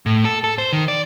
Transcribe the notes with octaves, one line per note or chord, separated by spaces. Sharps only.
A2
A4
A4
C5
D#3
D5